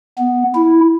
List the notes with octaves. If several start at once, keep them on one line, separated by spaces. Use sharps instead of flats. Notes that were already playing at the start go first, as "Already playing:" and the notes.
B3
E4